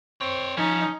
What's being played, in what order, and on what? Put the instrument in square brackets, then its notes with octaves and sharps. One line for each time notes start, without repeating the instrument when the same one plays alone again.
[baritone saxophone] C4 [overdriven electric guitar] C5 C#5
[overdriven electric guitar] F3 [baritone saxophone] C#4 [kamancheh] D#4